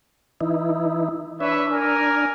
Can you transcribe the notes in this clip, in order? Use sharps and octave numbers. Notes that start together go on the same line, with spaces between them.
E3 D#4 E4
D4 B4 C#5 E5
A#4 G#5